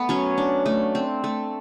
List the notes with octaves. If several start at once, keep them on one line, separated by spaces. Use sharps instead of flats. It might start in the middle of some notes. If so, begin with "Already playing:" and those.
Already playing: A3 B3 B4
F#3 C#4 C#5
D4
A3
C4
A3